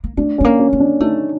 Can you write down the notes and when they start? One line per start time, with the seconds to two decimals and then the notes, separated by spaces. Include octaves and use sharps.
0.04 A#3
0.17 A3 D4
0.38 A3 C#4
0.44 A#3
0.60 C#4
0.73 A#3
0.80 D4
1.00 A3 D#4